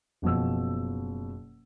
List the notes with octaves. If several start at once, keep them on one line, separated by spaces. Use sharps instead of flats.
F#1 B2 F3 E6